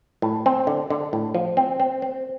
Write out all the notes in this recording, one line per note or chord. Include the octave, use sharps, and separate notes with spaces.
A2
C4
D3
D3
A2
F3
C4
C4
C4